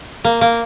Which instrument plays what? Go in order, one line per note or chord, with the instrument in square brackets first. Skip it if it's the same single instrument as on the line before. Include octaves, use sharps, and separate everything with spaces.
[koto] A#3
A#3